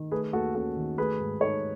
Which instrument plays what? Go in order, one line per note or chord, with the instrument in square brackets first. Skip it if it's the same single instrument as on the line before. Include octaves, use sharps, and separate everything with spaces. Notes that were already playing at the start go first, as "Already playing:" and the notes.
Already playing: [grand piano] D#3
A3 G#4 B4
D#2 F#4 A4
C#4 F#4 A4
D#3
A3 G#4 B4
G#2
D#4 A4 C#5